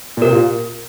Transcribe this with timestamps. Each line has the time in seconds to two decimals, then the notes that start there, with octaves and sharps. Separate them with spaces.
0.17 A#2
0.22 C3 A#4
0.32 A#2